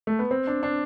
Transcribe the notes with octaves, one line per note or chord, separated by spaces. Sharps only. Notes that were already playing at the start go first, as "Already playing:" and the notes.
A3
B3
C4
D4
D4